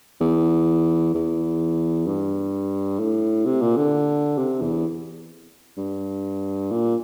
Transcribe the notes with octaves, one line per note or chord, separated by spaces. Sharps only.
E2
E2
G2
A2
C3
A#2
D3
C3
E2
G2
A#2